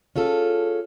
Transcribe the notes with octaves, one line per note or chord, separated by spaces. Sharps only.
C#4 F4 G#4 A4